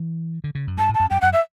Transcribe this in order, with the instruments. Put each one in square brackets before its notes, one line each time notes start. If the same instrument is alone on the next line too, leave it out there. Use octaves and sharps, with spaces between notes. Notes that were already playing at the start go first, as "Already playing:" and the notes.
Already playing: [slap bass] E3
D3
C#3
F#2
[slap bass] G2 [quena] A5
[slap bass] A2
[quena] A5
[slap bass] F#2
[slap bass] F#2 [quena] G5
[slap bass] F#2 [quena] F#5
[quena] E5